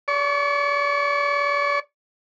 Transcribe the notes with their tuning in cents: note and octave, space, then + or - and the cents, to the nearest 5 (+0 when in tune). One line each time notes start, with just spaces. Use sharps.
D5 -40 C#6 +0